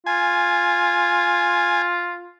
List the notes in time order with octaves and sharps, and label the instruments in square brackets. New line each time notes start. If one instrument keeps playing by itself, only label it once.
[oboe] F4 [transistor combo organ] G#5